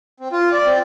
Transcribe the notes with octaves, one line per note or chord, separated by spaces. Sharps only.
C4
F4
D5
C4